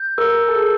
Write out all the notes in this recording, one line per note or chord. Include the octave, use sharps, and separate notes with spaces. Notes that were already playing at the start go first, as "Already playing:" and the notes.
Already playing: G6
A#4 E6
E6
A4
G#4